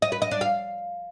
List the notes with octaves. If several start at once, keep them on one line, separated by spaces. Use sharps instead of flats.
D#5
B4
D#5
D4
F5